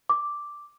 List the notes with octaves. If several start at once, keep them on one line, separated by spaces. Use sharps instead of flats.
D6